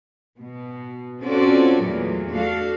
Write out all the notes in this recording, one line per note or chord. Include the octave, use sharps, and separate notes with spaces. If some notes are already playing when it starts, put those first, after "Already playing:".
B2
C4 C#4 F4 F#4 A4 D5
E2 A#2 F#3 A3 A#3
A3 D4 F#4 A4 F5